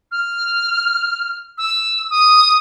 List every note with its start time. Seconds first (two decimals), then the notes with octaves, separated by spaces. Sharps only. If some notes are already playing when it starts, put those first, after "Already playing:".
0.11 F6
1.58 E6
2.10 D#6